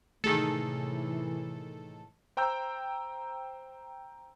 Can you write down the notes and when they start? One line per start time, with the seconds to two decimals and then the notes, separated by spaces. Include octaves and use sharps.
0.24 A2 C3 D#3 E3 A3 G#4 A4
2.37 C5 G5 A#5 E6 G6